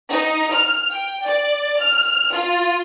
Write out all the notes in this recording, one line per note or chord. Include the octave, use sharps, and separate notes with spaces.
D#4
F6
G5
D5
F6
F4